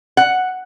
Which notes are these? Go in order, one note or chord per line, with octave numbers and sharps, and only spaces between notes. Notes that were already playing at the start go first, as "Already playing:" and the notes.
F#5